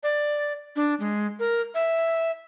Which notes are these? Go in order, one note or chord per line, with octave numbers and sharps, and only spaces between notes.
D5
D4
G#3
A#4
E5